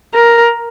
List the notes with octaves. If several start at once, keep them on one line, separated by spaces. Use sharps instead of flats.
A#4